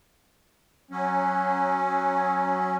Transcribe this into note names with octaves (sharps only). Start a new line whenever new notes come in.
F#3 C#4